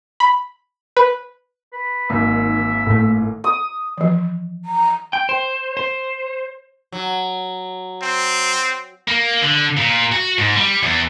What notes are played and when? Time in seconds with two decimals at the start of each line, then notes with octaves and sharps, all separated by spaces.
0.20 B5
0.97 B4
1.73 B4
2.10 G#1 D#3 A#3 D#4 E5
2.87 A2 A3
3.44 D#6
3.98 E3 F3
4.65 A#5
5.13 G5
5.29 C5
5.77 C5
6.92 F#3
8.02 C4
9.08 A#3
9.43 D3
9.77 A#2
10.12 F#4
10.39 G#2
10.56 G3
10.83 E2